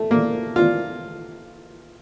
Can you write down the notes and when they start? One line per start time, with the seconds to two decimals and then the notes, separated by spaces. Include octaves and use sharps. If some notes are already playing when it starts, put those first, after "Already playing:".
Already playing: A3
0.11 A#3
0.56 F4